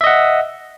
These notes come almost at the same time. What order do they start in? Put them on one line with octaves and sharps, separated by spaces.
E5 D#5 F#5